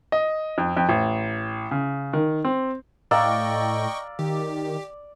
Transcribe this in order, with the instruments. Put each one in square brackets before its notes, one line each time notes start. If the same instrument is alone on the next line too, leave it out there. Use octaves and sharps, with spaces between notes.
[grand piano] D#5
F2
F2
A1
C#3
D#3
C4
[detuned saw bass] A2 [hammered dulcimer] D5 [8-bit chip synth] D#5 G5 C#6 [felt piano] F5 A#5 E6
[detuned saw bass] D#3 [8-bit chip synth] G4